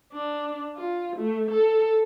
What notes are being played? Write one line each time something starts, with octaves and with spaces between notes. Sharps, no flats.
D4
F4
A3
A4